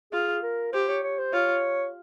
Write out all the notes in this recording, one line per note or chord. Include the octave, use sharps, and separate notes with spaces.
F4 G#4
A#4
G4 C5
C#5
C#5
C5
F4 C#5